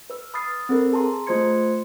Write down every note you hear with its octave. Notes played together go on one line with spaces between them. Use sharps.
B4 E6
B5 D#6 F6 A6 C7
C4 A4 A#4
G#4 A5 A#5 C6
A3 F4 C5 C6 G#6 C#7